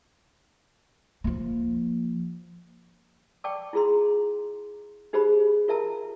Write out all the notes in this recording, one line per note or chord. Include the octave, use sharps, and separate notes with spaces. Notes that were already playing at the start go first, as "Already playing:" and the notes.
F3 A#3
D5 G5 A5 C#6 D6
E4 F4 G#4 A#5 C6
D#4 G4 G#4 C5 B5
F4 A#4 E5 A5 A#5